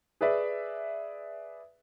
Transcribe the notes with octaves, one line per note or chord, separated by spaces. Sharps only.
G#4 B4 D5 E5